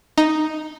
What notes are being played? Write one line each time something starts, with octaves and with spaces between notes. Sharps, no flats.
D#4